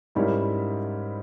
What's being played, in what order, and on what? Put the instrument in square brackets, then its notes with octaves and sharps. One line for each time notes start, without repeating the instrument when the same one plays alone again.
[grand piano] G#2 G3 C#4 E4 A#4